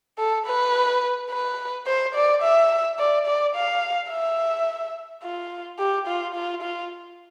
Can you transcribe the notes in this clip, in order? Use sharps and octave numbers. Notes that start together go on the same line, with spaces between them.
A4
B4
B4
C5
D5
E5
D5
D5
F5
E5
F4
G4
F4
F4
F4